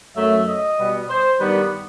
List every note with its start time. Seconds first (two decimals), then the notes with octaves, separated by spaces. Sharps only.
0.16 F#2 F#3 A3 E5
0.47 D#5
0.78 B2 G3 B3
1.09 C5
1.39 G2 D#3 G3 B3 B4